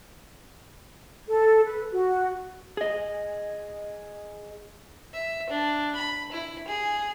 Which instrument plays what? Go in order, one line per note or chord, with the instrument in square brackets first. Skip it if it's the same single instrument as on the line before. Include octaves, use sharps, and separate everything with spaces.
[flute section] A4
B4
F#4
[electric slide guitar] G#4 D#5
[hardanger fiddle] E5
D4
B5
E4
G#4